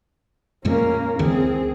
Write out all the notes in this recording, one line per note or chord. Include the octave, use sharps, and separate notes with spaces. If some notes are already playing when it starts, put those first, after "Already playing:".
F2 A#2 G#3 A#3 C#4
C#2 D3 E3 C4 G#4